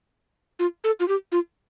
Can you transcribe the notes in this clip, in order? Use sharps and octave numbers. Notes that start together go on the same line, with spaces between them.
F4
A4
F4
G4
F4